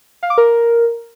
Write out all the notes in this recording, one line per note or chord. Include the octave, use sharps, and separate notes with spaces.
F5
D6
A#4